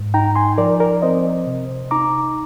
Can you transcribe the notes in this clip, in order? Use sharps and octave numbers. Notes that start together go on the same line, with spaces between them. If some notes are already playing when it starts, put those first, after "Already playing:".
Already playing: G#2
D#4 G5 A#5
G#5 C6
F3 A#4 D5
A#4 D5
C4 C5 D#5
C3
D#4 A#5 D6